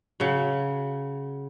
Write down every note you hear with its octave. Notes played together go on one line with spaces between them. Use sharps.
C#3 F#3